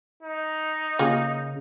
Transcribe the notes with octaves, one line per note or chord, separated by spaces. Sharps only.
D#4
C#3 A#3 F4 G#4